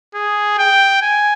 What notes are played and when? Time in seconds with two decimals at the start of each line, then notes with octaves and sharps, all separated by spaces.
0.15 G#4
0.59 G5
1.02 G#5